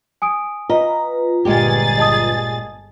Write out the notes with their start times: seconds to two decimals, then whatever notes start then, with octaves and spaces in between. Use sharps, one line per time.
0.22 G#5 D#6 D7
0.70 F4 B4 D#5 A#5
1.45 G1 A#2 G#3 G4 G#4 A6
1.98 D#5 A5 D#6